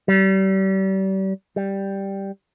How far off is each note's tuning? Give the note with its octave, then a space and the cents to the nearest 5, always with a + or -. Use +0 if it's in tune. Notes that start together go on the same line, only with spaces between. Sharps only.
G3 -35
G3 +0